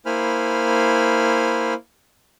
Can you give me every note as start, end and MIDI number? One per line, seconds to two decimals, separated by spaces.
0.06 1.74 58
0.06 1.74 64
0.06 1.74 72
0.06 1.74 80
0.06 1.74 83
0.06 1.74 89